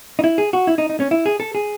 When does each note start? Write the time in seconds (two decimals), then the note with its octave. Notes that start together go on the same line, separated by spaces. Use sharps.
0.19 D#4
0.24 E4
0.38 G#4
0.53 F#4
0.67 E4
0.78 D#4
0.90 D#4
1.00 C#4
1.11 E4
1.26 G#4
1.40 A4
1.55 G#4